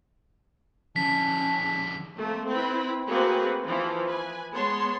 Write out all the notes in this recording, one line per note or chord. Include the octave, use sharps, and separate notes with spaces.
F2 D3 C#4 A5 B6
A3 A#3 C4
C4 E4 B4 B5
A3 A#3 C4 F#4 G#4 B4
E3 F3
B4 G#5
G#3 B3 C#5 A5 C6